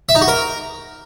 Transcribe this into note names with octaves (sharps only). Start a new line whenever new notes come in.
E5
D#4
F#4
A#4